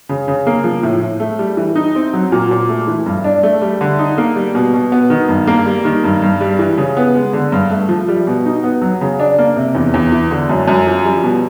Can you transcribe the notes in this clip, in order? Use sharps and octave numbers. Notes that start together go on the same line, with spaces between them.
C#3
C#3
A#3
F3
A2
A2
A3
G3
E3
D#4
C4
F#3
A#2
A#2
A3
E3
G2
D4
A3
G3
D3
D#4
A#3
G3
B2
B2
B3
D#3
G2
A#3
G3
D#3
G2
G2
G3
E3
C#3
B3
G#3
D3
G2
A3
F3
G3
B2
D#4
B3
F#3
C#3
D4
A#3
C3
E2
E2
E3
D3
F#2
F#2
F3
G3
B2